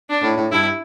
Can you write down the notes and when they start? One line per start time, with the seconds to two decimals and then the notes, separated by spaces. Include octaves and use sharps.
0.09 D4
0.22 A2
0.37 A2
0.52 G2 E4